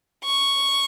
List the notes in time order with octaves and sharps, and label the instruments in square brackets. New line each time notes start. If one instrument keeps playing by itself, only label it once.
[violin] C#6